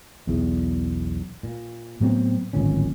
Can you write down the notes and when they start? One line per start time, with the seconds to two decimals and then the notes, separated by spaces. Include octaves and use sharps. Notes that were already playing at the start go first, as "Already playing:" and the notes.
0.27 B1 E2
1.43 A#2
2.00 A2 F#3 B3 C4
2.53 D1 G#1 A#2 C#4